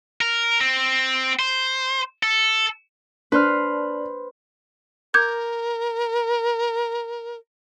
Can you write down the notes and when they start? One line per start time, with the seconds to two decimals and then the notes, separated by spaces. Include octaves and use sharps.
0.21 A#4
0.61 C4
1.39 C5
2.23 A4
3.32 D4 B4 C5 F6
5.14 A#4 D6 G6 G#6